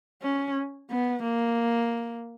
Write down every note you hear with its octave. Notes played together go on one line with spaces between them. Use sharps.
C#4
B3
A#3